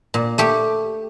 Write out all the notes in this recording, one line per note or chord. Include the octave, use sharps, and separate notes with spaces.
A#2
A3 G4